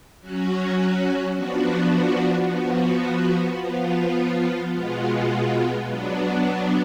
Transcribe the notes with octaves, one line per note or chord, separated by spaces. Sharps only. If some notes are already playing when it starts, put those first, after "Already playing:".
F#3 C#4 F#4
F3 B3 D4 F#4
F3 B3 F#4
F3 B3 F4
B2 G#3 B3 F4
F#3 B3 D4